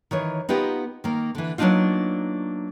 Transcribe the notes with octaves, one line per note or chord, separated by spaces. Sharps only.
D#3 E3 C#5
B3 D#4 F4 G4 A#4
D#3 A#3
D3 E3
F#3 A#3 B3 D4 D#4 F4